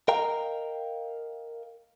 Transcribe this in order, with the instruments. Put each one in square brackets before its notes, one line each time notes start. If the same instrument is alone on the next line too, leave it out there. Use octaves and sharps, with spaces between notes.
[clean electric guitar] A#4 D#5 F5 G5 A#5